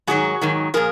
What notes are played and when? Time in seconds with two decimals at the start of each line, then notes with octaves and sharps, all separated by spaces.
0.07 G#2 D#3 F#3 F#4 G#4
0.41 G#2 D#3 F#3
0.74 A#2 F3 G#4 A#4